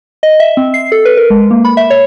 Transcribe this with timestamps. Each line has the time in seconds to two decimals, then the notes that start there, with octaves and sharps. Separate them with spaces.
0.23 D#5
0.40 E5
0.57 C4
0.74 C7
0.92 A4
1.05 B4
1.17 A#4
1.30 G#3
1.51 A#3
1.65 B5
1.77 E5
1.90 C#5